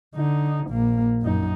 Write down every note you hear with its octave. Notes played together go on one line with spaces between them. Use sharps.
D3 D#4
A#1 A#3
F#2 D#4